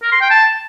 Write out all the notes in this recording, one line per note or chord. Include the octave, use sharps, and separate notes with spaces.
A#4
C6
G5
A5